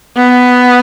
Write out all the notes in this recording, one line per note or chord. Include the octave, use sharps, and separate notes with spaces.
B3